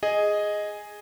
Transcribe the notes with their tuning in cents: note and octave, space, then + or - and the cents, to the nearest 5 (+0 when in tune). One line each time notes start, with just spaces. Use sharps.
G#4 +0 D#5 +0